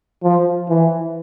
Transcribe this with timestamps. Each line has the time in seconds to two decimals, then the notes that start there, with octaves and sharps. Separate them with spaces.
0.23 F3
0.69 E3